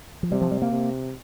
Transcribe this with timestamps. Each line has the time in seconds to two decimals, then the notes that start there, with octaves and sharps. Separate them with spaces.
0.23 F3
0.31 C3 G3
0.41 F3
0.51 G3
0.62 A#3
0.72 C3